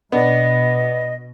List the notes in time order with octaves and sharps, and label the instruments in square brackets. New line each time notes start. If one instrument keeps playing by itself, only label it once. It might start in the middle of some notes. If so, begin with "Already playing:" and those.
[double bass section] B2 [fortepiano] B3 D4 [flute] D#5